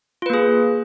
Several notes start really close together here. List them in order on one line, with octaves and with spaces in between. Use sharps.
F4 B4 A#3 G#4